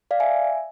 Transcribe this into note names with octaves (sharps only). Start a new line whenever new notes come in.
D5 F5
E5 G#5